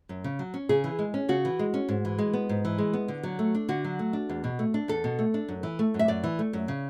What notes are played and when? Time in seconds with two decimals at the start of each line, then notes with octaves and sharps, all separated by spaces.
0.09 F#2
0.24 C#3
0.39 F#3
0.54 C#4
0.69 C#3 G#4
0.84 E3
0.99 G#3
1.14 C#4
1.29 C#3 F#4
1.45 E3
1.59 G#3
1.74 C#4
1.89 G#2
2.05 E3
2.18 G#3
2.33 B3
2.49 G#2
2.65 E3
2.78 G#3
2.93 B3
3.08 D3
3.23 F#3
3.39 A3
3.55 D4
3.69 D3 F#4
3.85 F#3
3.99 A3
4.13 D4
4.29 E2
4.44 B2
4.59 A3
4.74 D4
4.88 E2 A4
5.04 B2
5.19 A3
5.34 D4
5.49 F#2
5.63 E3
5.79 A3
5.94 F#2
5.99 E5
6.08 F#2 D5
6.24 E3
6.39 A3
6.53 F#2
6.68 C#3